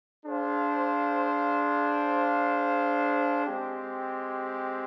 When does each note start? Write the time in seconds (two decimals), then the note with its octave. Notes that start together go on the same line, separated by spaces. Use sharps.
0.24 D4 G#4 C5 F5
3.44 G#3 C4 G4